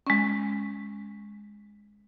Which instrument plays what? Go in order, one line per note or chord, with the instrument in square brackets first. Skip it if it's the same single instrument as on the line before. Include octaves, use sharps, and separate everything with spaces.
[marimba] G#3 C#4